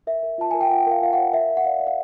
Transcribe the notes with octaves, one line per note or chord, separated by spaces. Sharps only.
A#4 E5
A#4
F4 A5
A#4 G#5
G5
F4 F#5
A#4 F5
F4 F5
C#5 F#5
A#4 E5
A#4
F#5
D5 F5
D5
F5